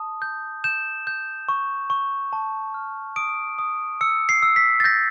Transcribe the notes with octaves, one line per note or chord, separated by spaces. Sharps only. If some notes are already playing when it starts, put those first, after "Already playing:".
Already playing: A5 D#6
G6
G6 E7
G6
C#6
C#6
A5
F6
D#6 D7
D#6
E6 C#7
C7
E6
B6
A6
G6 A#6